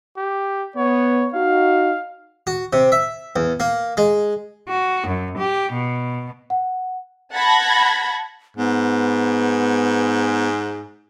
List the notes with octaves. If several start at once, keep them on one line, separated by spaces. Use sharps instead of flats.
G4
B3 C#5
D#4 F#4 F5
F#4
C3
E5
E2
A#3
G#3
F#4
F#2
G4
B2
F#5
F#5 A5 B5 G#6 A#6
G#2 B3